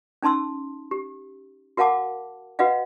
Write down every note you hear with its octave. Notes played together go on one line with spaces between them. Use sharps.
C#4 D#4 A5 C6 E6
G4
F#4 A#4 F5 F#5 A5 D6
F#4 B4 D#5 F5 F#5